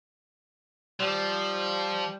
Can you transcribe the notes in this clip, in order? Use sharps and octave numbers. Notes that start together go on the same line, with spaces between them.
F3 G3